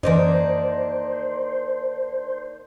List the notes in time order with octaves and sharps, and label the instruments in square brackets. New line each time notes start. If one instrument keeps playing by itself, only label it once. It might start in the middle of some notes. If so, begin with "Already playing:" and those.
[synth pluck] F#2 E3 [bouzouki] D#3 A#3 D4 [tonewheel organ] C5